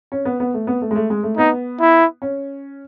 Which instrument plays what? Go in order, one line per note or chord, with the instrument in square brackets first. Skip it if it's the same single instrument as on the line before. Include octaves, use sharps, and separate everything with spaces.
[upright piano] C#4
B3
B3
A3
B3
A3
G#3
A3
G#3
A3
[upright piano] B3 [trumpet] D#4
[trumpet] E4
[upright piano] C#4